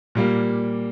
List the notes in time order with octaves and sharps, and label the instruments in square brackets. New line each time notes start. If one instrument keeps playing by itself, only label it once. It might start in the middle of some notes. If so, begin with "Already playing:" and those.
[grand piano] A#2 G3 A#3